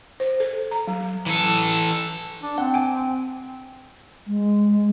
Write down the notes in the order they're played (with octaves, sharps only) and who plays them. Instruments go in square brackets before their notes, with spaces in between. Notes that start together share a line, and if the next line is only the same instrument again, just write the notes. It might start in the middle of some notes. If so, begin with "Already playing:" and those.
[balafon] C5
A4
A#5
F#3
[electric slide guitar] E3 A4
[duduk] D4
[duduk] C4 [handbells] F#5
[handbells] G#5 D7
[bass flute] G#3